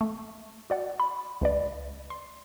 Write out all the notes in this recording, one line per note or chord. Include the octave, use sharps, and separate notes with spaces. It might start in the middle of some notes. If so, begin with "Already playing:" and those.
A3
F#4 D5 F#5
B5
C#2 B4 D5
C6